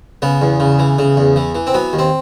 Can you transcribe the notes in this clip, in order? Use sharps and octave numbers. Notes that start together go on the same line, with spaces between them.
C#3 B3
E2
C#3
E3
C#3
E2
E3
E3
C4
F#3 B3
D#2
C4